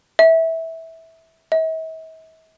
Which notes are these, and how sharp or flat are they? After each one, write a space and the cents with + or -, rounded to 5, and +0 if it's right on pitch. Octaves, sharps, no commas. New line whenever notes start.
E5 -15
E5 -45